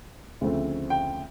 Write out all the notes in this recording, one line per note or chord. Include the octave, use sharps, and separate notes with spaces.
D2 C#3 F3 A3 C4
G5